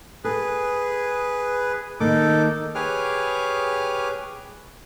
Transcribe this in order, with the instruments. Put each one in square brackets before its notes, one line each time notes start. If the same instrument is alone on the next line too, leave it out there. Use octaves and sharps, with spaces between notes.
[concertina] G#4 B4 [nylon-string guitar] A4
[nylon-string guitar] D#3 A#3 [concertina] D#4 A4 D6
[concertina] G4 G#4 B4 C#5 D6 F6